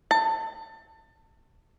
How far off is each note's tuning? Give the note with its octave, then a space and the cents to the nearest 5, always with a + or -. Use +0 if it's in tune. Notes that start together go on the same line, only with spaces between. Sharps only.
A5 +25